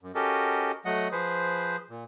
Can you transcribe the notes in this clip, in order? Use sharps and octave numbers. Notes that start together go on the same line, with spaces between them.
F#2
C#4 F#4 G4 A4 A#4 D#5
F#3 A3 D#5 F#5
F3 G#4 B4 C5
A#2